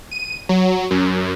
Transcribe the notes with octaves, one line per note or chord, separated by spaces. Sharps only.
D#7
F#3
F#2